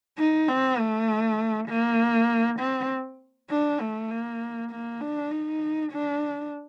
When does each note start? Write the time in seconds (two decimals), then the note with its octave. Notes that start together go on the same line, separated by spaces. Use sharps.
0.18 D#4
0.48 C4
0.78 A3
1.69 A#3
2.59 C4
3.50 D4
3.80 A3
4.11 A#3
4.71 A#3
5.01 D4
5.31 D#4
5.92 D4